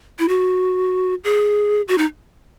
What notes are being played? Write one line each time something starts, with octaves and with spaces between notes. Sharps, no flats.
E4
F#4
G#4
F#4
D#4